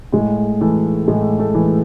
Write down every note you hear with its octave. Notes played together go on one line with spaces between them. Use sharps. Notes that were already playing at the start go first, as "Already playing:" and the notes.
A2 G#3
E3 A3
A2 G#3
A3
E3